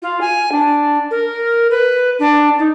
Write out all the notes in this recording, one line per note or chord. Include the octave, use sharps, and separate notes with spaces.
F4
G#5
D4
A#4
B4
D4
D#4